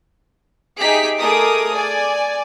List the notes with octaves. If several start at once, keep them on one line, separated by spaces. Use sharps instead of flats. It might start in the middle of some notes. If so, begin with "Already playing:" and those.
D#4 G4 G#4 E5 B6 D7
A3 G#4 A#4 D6 D#6
D5 G#5